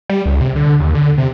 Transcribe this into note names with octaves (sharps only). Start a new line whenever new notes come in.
G3
C#2
C3
D3
D#2
D3
C3